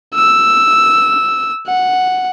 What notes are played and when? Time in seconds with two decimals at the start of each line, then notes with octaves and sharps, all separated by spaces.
0.15 E6
1.67 F#5